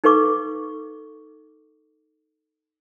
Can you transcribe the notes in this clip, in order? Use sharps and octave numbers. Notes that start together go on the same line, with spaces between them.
D#4 A4 B4 F5 C#6 D6